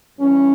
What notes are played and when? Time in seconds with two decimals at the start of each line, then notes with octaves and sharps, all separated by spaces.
0.18 G2 E3 C#4